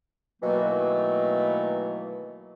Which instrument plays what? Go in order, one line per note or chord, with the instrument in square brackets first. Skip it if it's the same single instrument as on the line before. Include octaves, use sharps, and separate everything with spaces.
[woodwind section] B2 D#3 E3 F#3 A3 A#3